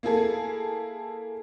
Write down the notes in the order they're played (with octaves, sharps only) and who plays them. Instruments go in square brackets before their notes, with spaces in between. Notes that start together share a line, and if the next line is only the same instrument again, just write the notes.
[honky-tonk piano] A#3 E4 G#4 A4